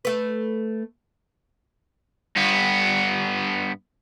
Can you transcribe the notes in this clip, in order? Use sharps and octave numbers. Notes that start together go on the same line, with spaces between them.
A3 B4
G2 B3